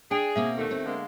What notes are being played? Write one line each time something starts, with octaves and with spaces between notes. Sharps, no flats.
D4 G#4 G5 G#5 D7
B2 A#3 C4 E5
D#2 D#3 A3
C4
D3 G#3 A#3